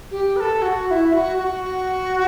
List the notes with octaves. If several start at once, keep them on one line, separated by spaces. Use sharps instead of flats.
G4
B4
A4
F#4
F#4
E4
F#4
F#4